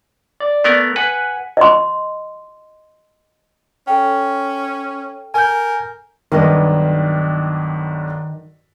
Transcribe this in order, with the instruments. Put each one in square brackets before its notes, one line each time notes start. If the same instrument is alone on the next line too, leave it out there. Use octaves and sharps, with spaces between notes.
[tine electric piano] D5
[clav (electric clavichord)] A3 B3 A#4
[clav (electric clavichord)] B4 [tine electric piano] F#5 G#5 B6
[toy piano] D#5 C6
[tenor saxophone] C#4 [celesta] A4 G5
[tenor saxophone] A#4 [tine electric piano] G#5 G6
[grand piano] B1 G2 [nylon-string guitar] D#3 B4 D#5